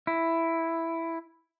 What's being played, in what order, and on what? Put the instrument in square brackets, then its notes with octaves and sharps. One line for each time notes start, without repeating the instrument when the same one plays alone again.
[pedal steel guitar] E4